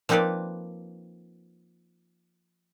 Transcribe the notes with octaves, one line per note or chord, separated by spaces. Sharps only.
F3 A#3 C4 D#4 B4 D5